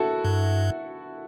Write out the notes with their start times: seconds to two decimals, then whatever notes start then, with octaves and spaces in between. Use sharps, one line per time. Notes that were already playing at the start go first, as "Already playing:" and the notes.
Already playing: E4 F#4 A4
0.25 G2